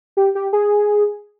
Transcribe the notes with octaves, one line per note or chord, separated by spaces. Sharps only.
G4
G4
G#4